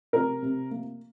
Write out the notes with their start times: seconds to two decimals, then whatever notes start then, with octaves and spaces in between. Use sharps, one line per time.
0.13 C3 A#4
0.42 C3
0.71 A#3